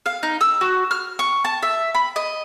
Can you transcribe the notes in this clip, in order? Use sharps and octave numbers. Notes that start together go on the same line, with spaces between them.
F5
D#4
E6
F#4
F6
C#6
A5
E5
B5
D#5